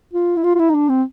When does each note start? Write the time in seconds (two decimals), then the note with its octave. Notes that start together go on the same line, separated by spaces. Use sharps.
0.13 F4
0.36 E4
0.44 F4
0.55 F4
0.59 E4
0.70 D#4
0.74 D4
0.89 C4